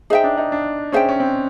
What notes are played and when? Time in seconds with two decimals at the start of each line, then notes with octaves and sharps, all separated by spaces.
0.10 D#4 G#4 C5 E5 G5
0.24 D4
0.37 D#4
0.52 D4
0.92 C#4 G#4 C5 E5 G5
1.09 C#4
1.20 C4